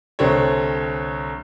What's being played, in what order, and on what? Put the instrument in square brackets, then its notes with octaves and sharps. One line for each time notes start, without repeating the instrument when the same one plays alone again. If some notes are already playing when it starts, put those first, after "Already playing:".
[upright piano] C2 D3 A3 C4 C#5